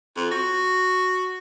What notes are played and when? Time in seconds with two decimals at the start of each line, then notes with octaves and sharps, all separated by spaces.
0.16 F2
0.31 F#4